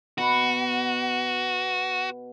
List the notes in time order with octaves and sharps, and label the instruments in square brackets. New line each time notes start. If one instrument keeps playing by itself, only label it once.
[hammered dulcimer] B2 B4 [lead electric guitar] F#4